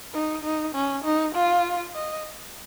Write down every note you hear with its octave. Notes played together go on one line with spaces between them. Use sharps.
D#4
D#4
C#4
D#4
F4
D#5